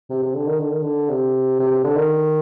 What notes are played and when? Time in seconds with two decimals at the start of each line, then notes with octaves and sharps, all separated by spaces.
0.09 C3
0.23 C3
0.34 D3
0.47 D#3
0.60 D3
0.71 D#3
0.82 D3
1.09 C3
1.59 C3
1.71 C3
1.84 D3
1.96 D#3